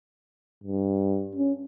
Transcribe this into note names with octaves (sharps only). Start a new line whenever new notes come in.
G2
C#4